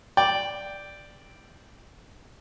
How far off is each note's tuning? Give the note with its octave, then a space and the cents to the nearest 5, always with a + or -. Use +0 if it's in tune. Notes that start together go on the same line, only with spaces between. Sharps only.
D5 +0 G5 +0